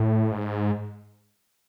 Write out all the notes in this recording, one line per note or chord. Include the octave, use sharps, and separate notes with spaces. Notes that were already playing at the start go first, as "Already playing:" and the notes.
Already playing: A2
G#2